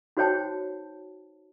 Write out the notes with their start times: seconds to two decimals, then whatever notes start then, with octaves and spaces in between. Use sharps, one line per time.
0.17 D#4 F#4 C5 C#5 G5 A5